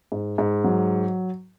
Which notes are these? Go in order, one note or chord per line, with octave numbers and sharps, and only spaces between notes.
G#2
G#2
F#3